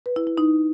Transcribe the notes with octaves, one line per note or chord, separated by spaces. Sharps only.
B4
E4
E4
D#4